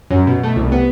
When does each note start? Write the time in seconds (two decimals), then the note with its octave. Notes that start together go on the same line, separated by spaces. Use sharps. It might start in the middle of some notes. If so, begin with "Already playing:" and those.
0.10 F#2
0.27 B2
0.43 A3
0.56 C2
0.72 B3